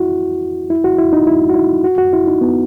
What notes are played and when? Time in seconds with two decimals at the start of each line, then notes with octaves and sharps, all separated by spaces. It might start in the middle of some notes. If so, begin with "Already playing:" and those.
Already playing: E4 F#4
0.70 E4
0.84 F#4
0.98 E4
1.13 D#4
1.27 E4
1.50 F#4
1.56 E4
1.84 F#4
1.98 F#4
2.13 E4
2.27 D#4
2.41 B3